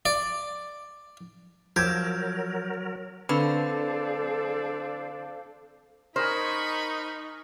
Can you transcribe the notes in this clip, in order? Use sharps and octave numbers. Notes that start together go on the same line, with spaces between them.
D5
F3 F#3 G4 A#4 E6 G#6
D3 C4 D4 A4 B4 C5 F5 B5
D#4 A#4 C5 D#5 G#5 B5 C#6